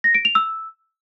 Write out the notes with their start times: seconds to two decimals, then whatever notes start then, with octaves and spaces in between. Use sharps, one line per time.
0.04 A#6
0.15 D7
0.25 F7
0.35 E6